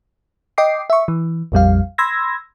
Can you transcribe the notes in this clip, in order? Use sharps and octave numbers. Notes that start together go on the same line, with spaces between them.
D#5 G5 D6 C7
E5 C#6
E3
A#1 F2 G3 F5
B5 C6 E6 G#6 A#6